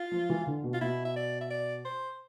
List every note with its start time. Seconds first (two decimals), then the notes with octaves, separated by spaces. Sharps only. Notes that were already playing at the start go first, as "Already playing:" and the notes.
Already playing: F4
0.12 F3
0.29 E3
0.47 D3
0.64 B2
0.73 F4
0.81 B2 E4
1.05 E5
1.16 D5
1.41 E5
1.51 D5
1.85 C5